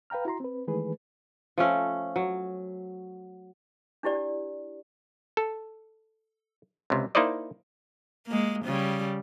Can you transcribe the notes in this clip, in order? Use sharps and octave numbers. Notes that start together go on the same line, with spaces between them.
B4 F5 G5 A#5 F6
E4 F#4 A#5 C6
C4 B4
D#3 E3 G#3 A3 G#4 B4
F3 A3 C#4
F#3
D4 E4 G4 D5
A4
C#2 C3
A#3 D#4 E4 C5 D5 D#5
G#3 A#3
C#3 G3